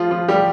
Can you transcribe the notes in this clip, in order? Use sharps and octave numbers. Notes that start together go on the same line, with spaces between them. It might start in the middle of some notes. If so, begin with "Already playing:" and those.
Already playing: F3 F4
F3 F4
G3 G4